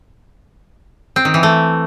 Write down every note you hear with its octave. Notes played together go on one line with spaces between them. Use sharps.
C4
D#3
E3
A3